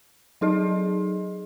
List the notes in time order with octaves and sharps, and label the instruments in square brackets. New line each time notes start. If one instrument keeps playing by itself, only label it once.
[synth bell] F#3 D#4 G#4 D#5